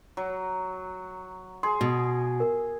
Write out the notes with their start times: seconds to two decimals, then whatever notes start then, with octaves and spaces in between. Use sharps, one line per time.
0.17 F#3
1.63 G#4 C6
1.81 B2
2.40 A#4